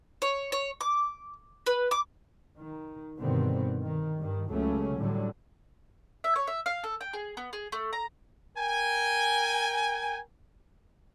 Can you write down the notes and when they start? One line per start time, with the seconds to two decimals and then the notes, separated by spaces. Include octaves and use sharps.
0.22 C#5
0.52 C#5
0.81 D6
1.66 B4
1.91 D6
2.58 D#3
3.19 G2 B2 D3 D#3 B3 C4
3.83 D#3
4.17 G2 D#3
4.49 C#2 C#3 F#3 A3 C#4
4.97 A2 D3 F#3 G3
6.24 E5
6.36 C#5
6.47 E5
6.66 F5
6.84 A4
7.01 G5
7.13 G#4
7.37 B3
7.53 G#4
7.72 A3
7.93 A#5
8.57 A#4 G5 G#5